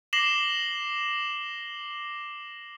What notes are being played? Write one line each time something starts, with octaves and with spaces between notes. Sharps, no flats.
D6 A#6 C7 E7 F#7 G7